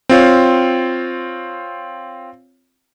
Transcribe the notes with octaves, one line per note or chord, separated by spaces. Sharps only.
C4 F4 C#5